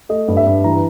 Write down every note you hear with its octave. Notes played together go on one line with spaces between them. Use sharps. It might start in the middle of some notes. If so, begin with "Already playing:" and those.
A3 D#5
G2
E5
G2
E3 A#5